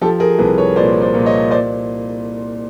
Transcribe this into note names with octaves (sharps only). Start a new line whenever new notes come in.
F3 G4 A4
G#4 A#4
C2 A4 B4
B4 C#5
A#2 C5 D5
C5 D5
A#2
C#5 D#5
C5 D5